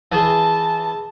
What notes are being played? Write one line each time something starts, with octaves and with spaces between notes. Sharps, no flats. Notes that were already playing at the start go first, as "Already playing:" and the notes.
E3 G#4 A5